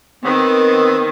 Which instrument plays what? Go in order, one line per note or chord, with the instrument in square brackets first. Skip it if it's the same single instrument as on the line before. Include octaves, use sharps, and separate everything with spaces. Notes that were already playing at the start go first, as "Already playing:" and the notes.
[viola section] D#3 [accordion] B3 C4